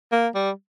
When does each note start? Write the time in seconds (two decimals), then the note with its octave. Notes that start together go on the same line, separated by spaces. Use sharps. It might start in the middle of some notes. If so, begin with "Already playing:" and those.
0.12 A#3
0.35 G3